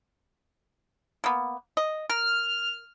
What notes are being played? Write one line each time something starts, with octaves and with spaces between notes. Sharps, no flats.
A#3 B3
D#5
A#4 F6